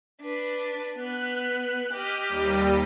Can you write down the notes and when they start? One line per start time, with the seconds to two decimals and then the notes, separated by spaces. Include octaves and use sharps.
0.22 D4 B4
0.96 B3 F#6
1.93 G4 D#5 F6
2.29 D#2 G3